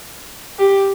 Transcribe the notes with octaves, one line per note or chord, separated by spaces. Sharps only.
G4